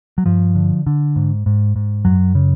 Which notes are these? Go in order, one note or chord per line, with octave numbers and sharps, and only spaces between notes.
F#3
G2 F3
D3
D3
G#2
G#2
G#2
F#2 F#3
C#3